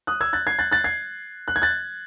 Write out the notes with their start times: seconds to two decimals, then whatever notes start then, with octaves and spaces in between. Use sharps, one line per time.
0.07 D#6 F#6
0.21 E6 G#6
0.33 F#6 A6
0.47 G#6 C7
0.59 F#6 A6
0.72 F#6 A6
0.84 G#6 C7
1.48 F#6
1.56 G#6
1.62 F#6 A6